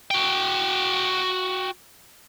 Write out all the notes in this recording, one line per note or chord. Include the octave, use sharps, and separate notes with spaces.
F#4 G5